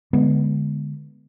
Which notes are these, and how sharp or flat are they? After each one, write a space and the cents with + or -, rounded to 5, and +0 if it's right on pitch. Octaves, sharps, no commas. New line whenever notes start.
D3 +0 G#3 +0 B3 -10